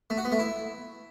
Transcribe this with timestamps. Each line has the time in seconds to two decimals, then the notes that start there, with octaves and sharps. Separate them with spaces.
0.10 A3
0.17 F#4
0.25 B3
0.32 A3
0.39 E4